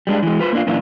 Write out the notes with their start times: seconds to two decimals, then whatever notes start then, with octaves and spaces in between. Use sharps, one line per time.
0.07 G3 G#3 D4
0.23 E3 G#3
0.39 F4 B4 C5
0.53 A#3 D4 F4
0.67 F#2 A#2 E3 D4 F4